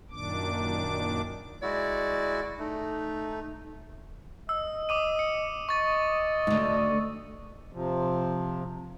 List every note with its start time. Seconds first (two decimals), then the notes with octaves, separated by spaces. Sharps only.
0.11 F#2 A#2 D#3 D4 D6
1.63 G#3 E4 F#4 D5
2.59 A3 D#4
4.49 D#5 E6
4.89 D6 D#6 D#7
5.19 C#7
5.69 D#5 C#6 A6
6.47 D2 G#2
7.72 C3 F3